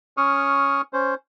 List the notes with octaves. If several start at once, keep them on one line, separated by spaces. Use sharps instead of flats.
C#4 C#6 D#6 F6
C#4 C5